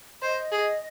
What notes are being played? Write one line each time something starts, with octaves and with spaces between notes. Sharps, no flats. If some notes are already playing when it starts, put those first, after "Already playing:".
C5 D#5
G#4